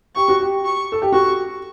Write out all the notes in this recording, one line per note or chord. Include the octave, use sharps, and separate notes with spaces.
G4 C#6
F#4
G4
C#6
A4
G4
F#4 C#6